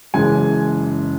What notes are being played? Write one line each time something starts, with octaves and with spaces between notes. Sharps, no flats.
F#1 F#2 E3 G#3 G#5